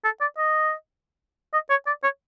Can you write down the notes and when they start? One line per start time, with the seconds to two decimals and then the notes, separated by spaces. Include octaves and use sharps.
0.04 A4
0.21 D5
0.37 D#5
1.53 D#5
1.70 C#5
1.87 D5
2.03 C#5